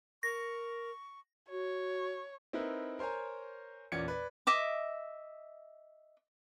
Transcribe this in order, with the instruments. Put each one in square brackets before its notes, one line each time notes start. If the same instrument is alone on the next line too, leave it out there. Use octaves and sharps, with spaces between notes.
[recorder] A#4 [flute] C#6 [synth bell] A#6
[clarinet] F#4 [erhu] C#5
[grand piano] C4 D#4 E4 A#4 B4
A#4 C5 C#5 G#5 A#5
E2 A#2 C#4 D5 G#6 C#7
B4 D5
[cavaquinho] D#5 E5 D6